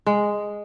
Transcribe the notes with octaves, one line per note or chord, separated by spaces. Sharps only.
G#3